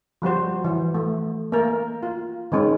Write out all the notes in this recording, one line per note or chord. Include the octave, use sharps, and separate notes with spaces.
F3 G3 F#4 C5
E3
A3
A#3 A#4
F4
D#3 G#3 C#4